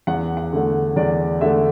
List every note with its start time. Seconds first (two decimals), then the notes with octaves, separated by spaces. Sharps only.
0.07 E2 F#5
0.37 F#5
0.53 D3 A3
0.96 E2 D5
1.41 D3 A3 E5